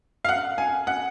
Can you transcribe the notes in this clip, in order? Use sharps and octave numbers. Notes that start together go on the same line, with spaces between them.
F5
F#5
G#5
F#5